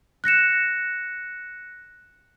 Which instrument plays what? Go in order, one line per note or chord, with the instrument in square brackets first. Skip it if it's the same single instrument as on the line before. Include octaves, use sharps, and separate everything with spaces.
[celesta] F#6 A#6 C#7 E7